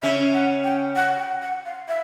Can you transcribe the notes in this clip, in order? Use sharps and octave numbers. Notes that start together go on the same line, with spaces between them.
C#3 C#4 E5
F#5
G5
F#5
G5
F#5
F5
E5